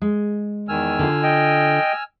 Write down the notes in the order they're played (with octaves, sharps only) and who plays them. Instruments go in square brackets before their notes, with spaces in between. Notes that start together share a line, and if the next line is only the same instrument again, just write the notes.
[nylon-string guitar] G#3
[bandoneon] E2 D#3 [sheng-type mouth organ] G#5 E6 F6
[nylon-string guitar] D3 F4
[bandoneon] D#5 G5